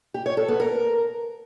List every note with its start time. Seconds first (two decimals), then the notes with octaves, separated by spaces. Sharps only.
0.14 G4
0.26 C#5
0.37 A4
0.48 B3
0.60 A#4